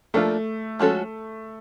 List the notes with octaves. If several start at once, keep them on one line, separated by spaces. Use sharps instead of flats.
F3 A3 A#3 D4 F4
F3 G#3 C#4 F#4 A4